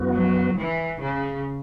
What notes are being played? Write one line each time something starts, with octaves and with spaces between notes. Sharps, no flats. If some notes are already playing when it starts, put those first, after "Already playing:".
Already playing: F#2 E3 B3 F#4
F#3
E3
C#3